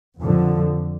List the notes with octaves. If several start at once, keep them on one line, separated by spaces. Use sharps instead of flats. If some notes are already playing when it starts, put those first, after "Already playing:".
F2 D3 F3